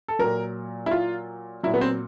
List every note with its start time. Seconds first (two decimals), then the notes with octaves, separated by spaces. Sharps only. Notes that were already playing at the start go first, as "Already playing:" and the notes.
0.08 A4
0.19 A#2 F#3 A#4
0.86 E4
0.91 F4
1.63 F#3 E4
1.67 A#2
1.74 B3
1.81 C4